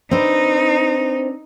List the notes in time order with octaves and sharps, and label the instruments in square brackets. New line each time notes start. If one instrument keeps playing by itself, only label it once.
[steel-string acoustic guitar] C4 D4 B4 [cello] D#4